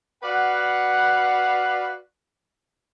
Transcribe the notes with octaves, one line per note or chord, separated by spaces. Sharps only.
F#4 B4 D5 F5 F#5